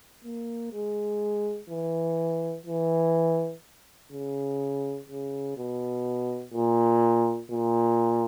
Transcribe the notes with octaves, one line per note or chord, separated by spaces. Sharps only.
A#3
G#3
E3
E3
C#3
C#3
B2
A#2
A#2